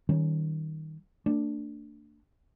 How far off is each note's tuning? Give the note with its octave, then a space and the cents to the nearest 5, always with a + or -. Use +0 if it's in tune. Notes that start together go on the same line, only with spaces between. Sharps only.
D#3 +10 G3 -25 C#4 +0
A3 +40 D4 +0